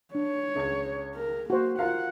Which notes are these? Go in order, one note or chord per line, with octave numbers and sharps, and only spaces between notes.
D4 C#5
C#2 G#6
A#4
A#3 F#4 C5
F4 A#4 F5 F#5